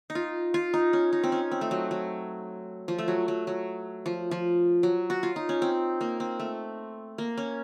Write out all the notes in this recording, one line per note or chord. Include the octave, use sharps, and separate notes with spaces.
D#4
F4
F4
D#4
C#4
D#4
C4
C#4
C4
A3
F#3
F#3
F3
A3
F#3
F#3
F#3
F3
F3
F#3
F#4
F4
D#4
C#4
C4
A#3
C4
A3
A#3
C#4